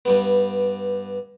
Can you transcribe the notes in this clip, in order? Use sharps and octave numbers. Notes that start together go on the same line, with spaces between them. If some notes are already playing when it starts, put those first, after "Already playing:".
G2 G3 B3